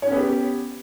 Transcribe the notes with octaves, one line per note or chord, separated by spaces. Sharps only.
B3 C#4 G4 C#5